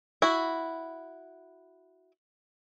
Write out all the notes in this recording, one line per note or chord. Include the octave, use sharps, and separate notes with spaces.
E4 F#4